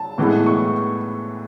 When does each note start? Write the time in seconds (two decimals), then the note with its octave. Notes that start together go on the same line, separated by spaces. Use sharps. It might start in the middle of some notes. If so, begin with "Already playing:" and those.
Already playing: A5
0.18 A2 E3 G#3 B3
0.46 C#6